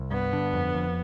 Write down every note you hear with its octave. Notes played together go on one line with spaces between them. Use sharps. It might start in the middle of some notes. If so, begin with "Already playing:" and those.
Already playing: C2
G2 B3
D3
F2
F2